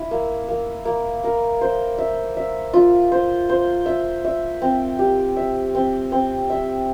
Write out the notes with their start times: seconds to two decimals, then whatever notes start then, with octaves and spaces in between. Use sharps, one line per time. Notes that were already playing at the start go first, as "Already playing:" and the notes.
Already playing: E4
0.11 A#3
0.48 A#3
0.85 A#3
1.24 A#4
1.61 C5
1.98 E5
2.37 E5
2.73 F4
3.12 C5
3.49 C5
3.86 E5
4.25 E5
4.62 C4
4.99 G4
5.37 E5
5.75 C4
6.12 C4
6.50 E5